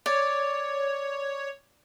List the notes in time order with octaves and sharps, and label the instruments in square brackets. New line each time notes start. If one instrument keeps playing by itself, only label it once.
[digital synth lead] C#5 [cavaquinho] D5